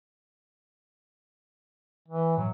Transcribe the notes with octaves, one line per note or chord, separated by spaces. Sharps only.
E3
A2 F#3